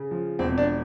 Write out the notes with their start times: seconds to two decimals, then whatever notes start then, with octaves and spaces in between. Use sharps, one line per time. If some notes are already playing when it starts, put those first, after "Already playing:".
Already playing: C#3
0.11 F3
0.39 E1 C4
0.58 D4